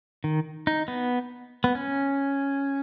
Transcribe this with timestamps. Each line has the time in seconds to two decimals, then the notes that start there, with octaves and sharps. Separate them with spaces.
0.24 D#3
0.67 D#4
0.88 B3
1.64 B3
1.75 C#4